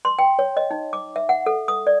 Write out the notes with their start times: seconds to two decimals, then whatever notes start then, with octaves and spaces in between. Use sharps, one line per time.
0.05 C6
0.19 G5
0.39 C#5
0.57 D#5
0.71 D#4
0.93 D6
1.16 E5
1.29 F#5
1.46 A4
1.68 D#6
1.87 D5